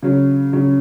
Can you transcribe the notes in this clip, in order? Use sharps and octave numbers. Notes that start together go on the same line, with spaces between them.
C#3 F#3 C#4
C#3 F#3 C#4